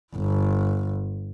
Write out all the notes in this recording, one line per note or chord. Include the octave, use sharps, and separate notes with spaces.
G1